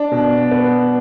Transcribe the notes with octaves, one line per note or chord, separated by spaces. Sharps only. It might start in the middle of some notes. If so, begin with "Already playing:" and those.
Already playing: D4
B2
B3